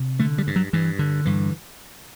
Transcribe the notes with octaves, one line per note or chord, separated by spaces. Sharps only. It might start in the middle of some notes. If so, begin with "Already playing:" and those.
Already playing: C3
D3 A3
G3
G2
F#3
G2 E3
D3
G2 E3